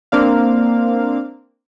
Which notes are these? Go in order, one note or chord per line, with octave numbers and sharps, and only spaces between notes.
A#3 C4 D4 F5